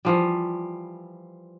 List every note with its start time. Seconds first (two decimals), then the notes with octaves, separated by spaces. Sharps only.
0.05 E3 F3 G3